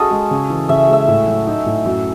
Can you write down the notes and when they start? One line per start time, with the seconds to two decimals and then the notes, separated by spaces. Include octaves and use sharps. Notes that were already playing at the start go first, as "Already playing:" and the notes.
Already playing: C#4 F#4 G#4 A4 D#5
0.11 G#3
0.31 C#3
0.50 E3
0.69 C#3 E5
0.88 G#3 E5
1.08 A2
1.28 F#3
1.47 D#4
1.66 A2
1.86 F#2